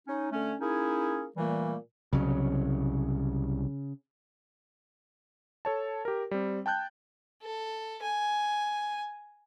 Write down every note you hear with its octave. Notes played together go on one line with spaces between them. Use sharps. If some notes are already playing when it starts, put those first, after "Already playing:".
C#4 D#4
D3 A3 C#4
A#3 C#4 D#4 E4 G#4
A#2 E3 G3 A3 A#3
C2 C#3 F#3
A4 C#5 A5
G4 A#4
G3 C4
G5 A5 F#6 G6
A4
G#5